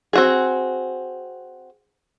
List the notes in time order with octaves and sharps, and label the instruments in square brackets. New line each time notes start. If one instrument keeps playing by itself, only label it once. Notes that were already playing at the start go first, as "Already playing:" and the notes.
[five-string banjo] C4 F#4 G#4